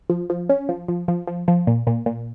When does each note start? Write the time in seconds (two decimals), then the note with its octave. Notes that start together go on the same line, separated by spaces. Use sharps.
0.10 F3
0.30 F3
0.49 C#4
0.69 F3
0.88 F3
1.08 F3
1.27 F3
1.48 F3
1.67 A#2
1.87 A#2
2.06 A#2